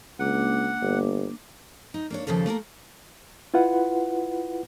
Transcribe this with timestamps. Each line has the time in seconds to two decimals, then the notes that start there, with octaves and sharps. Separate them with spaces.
0.19 C#2 A#3 D4 F#5 D6
0.82 G1
1.94 D#4
2.10 A#3 D4 C#5
2.27 D#2 C#3 F3 A#3 A4
2.46 A3 A#3 G4 A#4
3.54 E4 F4 B4 F#5